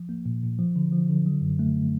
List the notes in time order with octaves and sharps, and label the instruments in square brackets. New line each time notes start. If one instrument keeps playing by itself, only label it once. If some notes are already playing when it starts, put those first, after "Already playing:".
Already playing: [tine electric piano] F3
A#3
A#2
A#2
F3
D3
F3
D3
F#3
F#2
A3